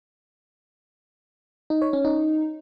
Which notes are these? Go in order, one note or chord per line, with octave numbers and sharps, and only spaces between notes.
D#4
C#5
C#4
D#4